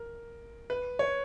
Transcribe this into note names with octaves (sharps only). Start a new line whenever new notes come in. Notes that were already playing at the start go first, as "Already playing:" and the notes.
Already playing: A#4
B4
C#5